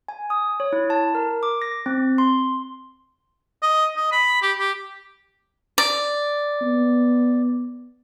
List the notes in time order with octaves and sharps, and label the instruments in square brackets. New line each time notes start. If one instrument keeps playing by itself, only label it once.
[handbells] G#5
D#6
C#5
E4
A5
A#4
D6
A#6
C4
C6
[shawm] D#5
D#5
B5
G4
G4
[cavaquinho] D5
[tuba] B3